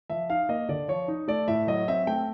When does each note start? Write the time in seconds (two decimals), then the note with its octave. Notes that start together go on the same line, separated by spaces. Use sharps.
0.10 F3 E5
0.30 D#4 F5
0.49 A#3 D#5
0.69 D3 D5
0.88 F3 C#5
1.08 D#4
1.28 A3 D5
1.48 A2 E5
1.67 F#3 D#5
1.88 C4 E5
2.07 A3 G5